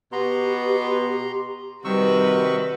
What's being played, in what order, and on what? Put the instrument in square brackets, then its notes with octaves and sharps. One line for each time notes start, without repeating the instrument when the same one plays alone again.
[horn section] B2 B3 [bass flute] G4 [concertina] A#5 C6
[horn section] C3 D#3 [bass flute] G3 [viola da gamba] F#4 B4 [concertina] C#6 E6